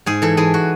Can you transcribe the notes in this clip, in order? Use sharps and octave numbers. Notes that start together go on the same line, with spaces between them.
G#2 G#4
E3 A4
E3 G#4
F#4